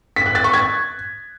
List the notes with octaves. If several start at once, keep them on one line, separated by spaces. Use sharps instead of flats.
B6
F#6
A6
C#6
G#6